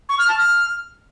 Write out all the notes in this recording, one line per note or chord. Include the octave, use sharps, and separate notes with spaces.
C#6
F6
A5
F6